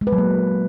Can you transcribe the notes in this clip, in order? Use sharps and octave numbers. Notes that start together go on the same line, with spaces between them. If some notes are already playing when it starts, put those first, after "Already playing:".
G#3
B4
F#3
A#3